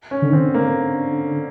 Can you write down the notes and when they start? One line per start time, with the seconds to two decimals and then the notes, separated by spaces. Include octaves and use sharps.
0.11 C#4
0.22 D3
0.30 D#3
0.33 C4
0.37 D3
0.54 A#3